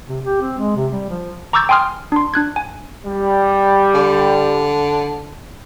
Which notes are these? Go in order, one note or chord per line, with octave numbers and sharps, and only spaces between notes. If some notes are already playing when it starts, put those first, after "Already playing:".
C3
G4
C4
G#3
C3
G3
F3
A#5 C#6 D6 E6 G6 A6
G5 G#5 C6 D#6 F6
D4 C6
D4 F#6 G#6
G#5
G3
D3